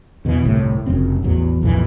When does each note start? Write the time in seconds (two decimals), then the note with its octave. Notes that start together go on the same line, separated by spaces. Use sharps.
0.25 E2 B2 D#3 E3
0.45 G1 C2 A2 C3
0.86 F1 F#2 C#3 C4
1.23 A1 E2 F#3
1.62 B1 F2 A#2 E3